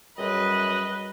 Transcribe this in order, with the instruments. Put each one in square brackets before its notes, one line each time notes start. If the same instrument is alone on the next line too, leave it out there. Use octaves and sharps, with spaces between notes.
[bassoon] F#2 [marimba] G3 G#4 E6 [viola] B4 [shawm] D#5